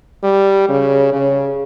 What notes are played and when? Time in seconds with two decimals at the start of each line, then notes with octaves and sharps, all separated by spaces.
0.24 G3
0.68 C#3
1.13 C#3